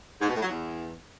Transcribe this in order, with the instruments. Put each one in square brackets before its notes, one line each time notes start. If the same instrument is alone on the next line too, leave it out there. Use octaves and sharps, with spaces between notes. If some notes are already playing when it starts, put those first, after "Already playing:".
[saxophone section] G#2
B2
A2
F#3
E2